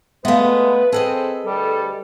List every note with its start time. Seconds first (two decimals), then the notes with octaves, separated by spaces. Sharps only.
0.25 G#3 A3 B3 B4 E5 F5
0.92 C4 G#4 A4 B4 D#5
1.46 D2 G3 G4 A4